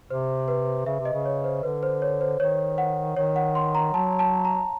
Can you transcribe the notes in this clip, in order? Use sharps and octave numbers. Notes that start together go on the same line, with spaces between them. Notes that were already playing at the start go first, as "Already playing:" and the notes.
C3 C5
B4
C#3 E5
C3
D#5
C#3
C#5
C5
D3 B4
C5
C#5
C5
D#3 C#5
F#5
D#3 C#5
F#5
C6
A#5
F#3 A5
A5
A#5